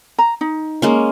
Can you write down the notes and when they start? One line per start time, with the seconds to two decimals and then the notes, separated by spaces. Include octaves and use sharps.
0.18 A#5
0.41 D#4
0.82 G#3 A#3 C#4